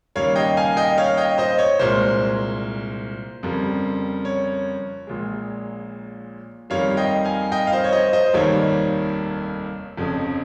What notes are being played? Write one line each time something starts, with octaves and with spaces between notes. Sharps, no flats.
D#2 C#3 G3 A#3 C#5 F5
D#5 G5
F5 G#5
D#5 G5
C#5 F5
D#5 G5
C5 D#5
C#5
C2 A#2 G#3 C5
F2 C#3 G3 A#3
C#5
A#1 A#2 G#3
F2 D#3 G3 A#3 C#5 F5
D#5 G5
F5 G#5
D#5 G5
F5
C5 D#5
C#5
C5 D#5
C5 D#5
F1 D#2 D#3 G3 A#3 C#5
F1 F2 C#3